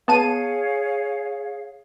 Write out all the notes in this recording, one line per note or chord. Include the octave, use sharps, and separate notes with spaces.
B3 G#4 C#5 F5 A5 D#7